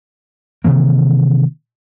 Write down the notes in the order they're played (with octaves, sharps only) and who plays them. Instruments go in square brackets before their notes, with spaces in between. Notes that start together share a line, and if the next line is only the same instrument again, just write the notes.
[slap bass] C3 D#3 E3 A#3